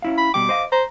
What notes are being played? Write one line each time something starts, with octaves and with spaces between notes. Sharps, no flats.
C#4 E4 F5
B5
B2 G3 G5 D6
C5 D#5 F5
C5 A#5